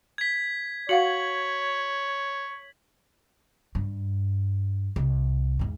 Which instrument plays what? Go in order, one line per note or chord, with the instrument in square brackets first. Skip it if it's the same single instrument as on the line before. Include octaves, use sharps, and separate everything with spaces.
[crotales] G#6 B6
[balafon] F#4 F5 F#5 [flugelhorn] C#5 [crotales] F#7
[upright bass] G2
C2
E2 G#2